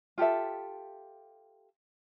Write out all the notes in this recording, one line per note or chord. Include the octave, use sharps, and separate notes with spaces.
F4 G4 A4 E5